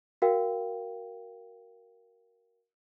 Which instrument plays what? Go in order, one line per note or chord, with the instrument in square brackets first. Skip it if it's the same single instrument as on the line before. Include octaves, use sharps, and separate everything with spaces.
[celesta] F#4 A#4 F5 G5